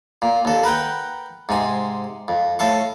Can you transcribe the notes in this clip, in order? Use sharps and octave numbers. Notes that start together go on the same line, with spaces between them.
A#2
D#2 A4
A#4 B4 F#5 G5
G#2 C3 G#5
F2
A2 A4 F5 C#6